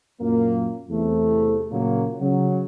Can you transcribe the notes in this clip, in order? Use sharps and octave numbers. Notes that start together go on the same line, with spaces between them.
F#2 A#2 F#3 A#3
E2 C3 A3
A#2 C#3 F#3 A#3
C#3 F#3